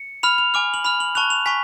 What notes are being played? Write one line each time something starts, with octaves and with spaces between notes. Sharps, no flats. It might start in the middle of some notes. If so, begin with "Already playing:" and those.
Already playing: C#7
B5 F6 F7
F7
G#5 D6 F6
F#7
B5 F6 F7
F#7
A5 C#6 F#6 F7
F7
G#5 C#6 B6